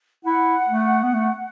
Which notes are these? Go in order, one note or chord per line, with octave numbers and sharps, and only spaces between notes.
E4 F#5
A3
B3
A3